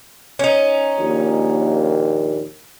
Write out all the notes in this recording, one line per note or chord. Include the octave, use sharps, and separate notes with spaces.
C#4 D#4
A#1 D#2 A#2